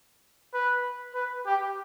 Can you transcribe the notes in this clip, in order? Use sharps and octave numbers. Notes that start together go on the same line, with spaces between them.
B4
B4
G4